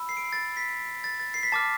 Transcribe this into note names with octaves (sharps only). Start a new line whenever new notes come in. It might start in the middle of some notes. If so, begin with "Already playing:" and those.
Already playing: B5 E6
C7
D7
C7
A6
B6
A6
A6
C7
B6
A5 D6 F6 A6